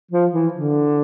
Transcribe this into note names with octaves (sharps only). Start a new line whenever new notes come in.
F3
E3
D3